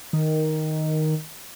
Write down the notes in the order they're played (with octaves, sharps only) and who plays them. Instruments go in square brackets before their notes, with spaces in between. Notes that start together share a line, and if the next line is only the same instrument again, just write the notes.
[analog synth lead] D#3